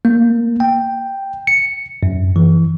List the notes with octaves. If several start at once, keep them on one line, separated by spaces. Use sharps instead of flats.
A#3
G5
C#7
F#2
E3